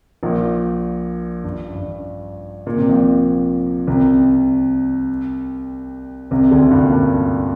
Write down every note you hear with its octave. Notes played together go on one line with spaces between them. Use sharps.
A#1 A#2
G2
G2
A#2
C3
A#1 A#2
C2 C3
C2 C3
D2 D3
G2
A#2
G2